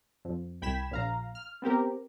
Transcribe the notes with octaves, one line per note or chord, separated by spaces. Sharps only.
F2
C2 G5 B5 G#6 B6 E7
A#1 F5 A#5
F6
B3 C4 G4 A#4